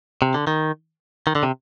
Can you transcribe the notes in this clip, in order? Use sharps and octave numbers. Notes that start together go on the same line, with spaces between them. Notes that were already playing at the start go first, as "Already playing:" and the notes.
C3
D3
D#3
D#3
D3
C3